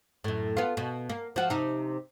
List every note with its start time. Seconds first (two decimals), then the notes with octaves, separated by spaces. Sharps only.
0.24 F#2 A2
0.57 B3 F4
0.77 B2
1.09 A#3
1.36 F3 F#4
1.50 C3 D#4